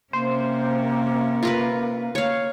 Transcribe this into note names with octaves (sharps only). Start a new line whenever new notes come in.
C3 A#3 C#4 C5
F4 A#4 B4
A#3 C#5 F5